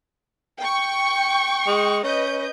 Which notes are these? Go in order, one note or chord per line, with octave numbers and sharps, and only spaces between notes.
G5 C#6
G#3
C#4 B4 D#5 G6